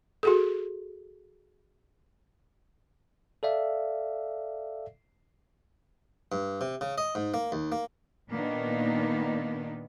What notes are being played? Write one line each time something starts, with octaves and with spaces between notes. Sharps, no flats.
F#4 G#4 A4
A4 D5 E5 F5
G2
C3
C#3
D#5
G#2
A#3
D#2
A#3
A#2 D#3 A#3 B3 D4 D#4